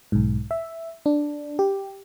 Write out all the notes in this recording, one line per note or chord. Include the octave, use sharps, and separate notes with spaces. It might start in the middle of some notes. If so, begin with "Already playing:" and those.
B1 G#2
E5
D4
G4